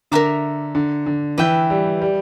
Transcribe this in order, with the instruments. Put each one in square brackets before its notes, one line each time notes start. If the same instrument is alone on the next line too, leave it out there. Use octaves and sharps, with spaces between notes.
[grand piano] D3 [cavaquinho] A#4 E5 A#5 D6
[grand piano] D3
D3
[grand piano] E3 [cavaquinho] B4 E5 G5
[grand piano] G3
G3